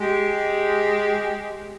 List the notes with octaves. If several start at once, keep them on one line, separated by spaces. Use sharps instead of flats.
G#3 G4